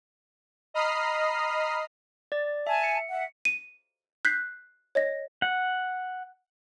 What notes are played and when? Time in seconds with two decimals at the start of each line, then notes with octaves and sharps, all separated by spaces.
0.74 D#5 A#5 B5 D#6 F6 C7
2.32 D5 A6
2.67 E5 G#5 A5
2.84 C#7
3.10 E5 F#5
3.45 D#7
4.25 F#6 G6 B6 C7
4.95 C#5 D#5 A#6
5.42 F#5